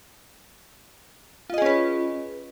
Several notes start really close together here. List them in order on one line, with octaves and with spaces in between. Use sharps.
F4 D#5 G#4 C#4 B4